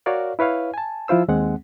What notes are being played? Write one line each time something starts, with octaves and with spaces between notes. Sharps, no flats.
F#4 A#4 C#5 D5 F5
E4 B4 C#5 F5
G#5 A5
F3 E4 F4 C5 E6
D#2 G#3 C4 F#5